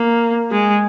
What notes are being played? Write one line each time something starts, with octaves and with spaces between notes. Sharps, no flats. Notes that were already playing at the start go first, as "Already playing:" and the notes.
Already playing: A#3
G#3